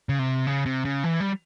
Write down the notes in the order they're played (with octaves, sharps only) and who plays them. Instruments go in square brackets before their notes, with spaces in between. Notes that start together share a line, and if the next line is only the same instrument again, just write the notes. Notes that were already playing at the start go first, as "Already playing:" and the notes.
[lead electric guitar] C#3
C3
C#3
C3
C#3
E3
G3